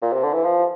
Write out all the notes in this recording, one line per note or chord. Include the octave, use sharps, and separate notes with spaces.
A#2
C3
D3
E3
F3